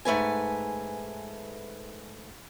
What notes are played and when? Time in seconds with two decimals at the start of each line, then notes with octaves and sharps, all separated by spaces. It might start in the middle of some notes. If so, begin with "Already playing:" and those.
0.05 G#2 A3 B4 G#5